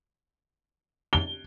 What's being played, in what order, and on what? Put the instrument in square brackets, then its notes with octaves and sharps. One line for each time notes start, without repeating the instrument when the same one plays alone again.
[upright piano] G7